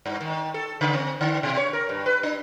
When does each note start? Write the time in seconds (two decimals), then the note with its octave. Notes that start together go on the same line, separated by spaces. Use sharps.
0.06 G2
0.20 D#3
0.54 A4
0.81 C#3
0.94 C4
1.21 D3
1.43 B2
1.57 C#5
1.73 A#4
1.89 G2
2.06 B4
2.23 D4